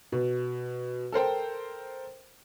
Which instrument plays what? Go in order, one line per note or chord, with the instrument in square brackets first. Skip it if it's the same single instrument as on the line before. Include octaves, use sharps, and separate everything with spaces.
[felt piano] B2
A4 A#4 C5 G5